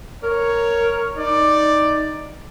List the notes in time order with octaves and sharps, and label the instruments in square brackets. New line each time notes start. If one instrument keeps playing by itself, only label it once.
[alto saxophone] A#4 [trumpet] C#5
[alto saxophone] D#4 [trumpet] D5